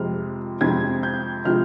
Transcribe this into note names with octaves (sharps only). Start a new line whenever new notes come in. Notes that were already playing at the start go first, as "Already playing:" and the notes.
Already playing: F2 C3 F3 G#3 F6
F2 C3 F3 G#3 G#6
G6
C3 F3 G#3 F6